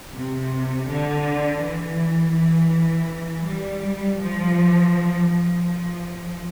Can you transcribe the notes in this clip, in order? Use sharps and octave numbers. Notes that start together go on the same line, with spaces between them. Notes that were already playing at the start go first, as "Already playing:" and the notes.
C3
D3
E3
E3
G3
F3
F3